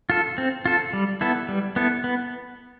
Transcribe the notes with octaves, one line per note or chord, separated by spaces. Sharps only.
F4 A4
C4
F4 A4
G3
B3 E4 A4
G3
B3 E4 A4
B3